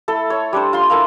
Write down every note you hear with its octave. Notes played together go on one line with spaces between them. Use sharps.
A3 E4 A4
C#5
G3 D4 C5
F4 C6
A3 E4 A#4 F5